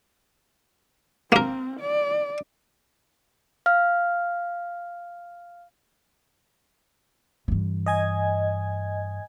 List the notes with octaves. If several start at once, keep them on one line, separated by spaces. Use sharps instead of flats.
A#3 C4 A#4
D5
F5 F6
G2 E3
D#5 G#5 G#6